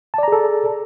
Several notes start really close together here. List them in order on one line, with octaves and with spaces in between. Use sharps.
A5 D5 A#5 G#4 A4